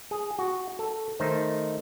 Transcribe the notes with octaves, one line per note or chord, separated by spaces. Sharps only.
G#4
F#4
A4
D#3 A3 D#4 C5